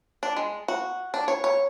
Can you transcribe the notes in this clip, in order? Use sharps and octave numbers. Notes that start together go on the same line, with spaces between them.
D4
G#3
F#4
D4
C#5
C#5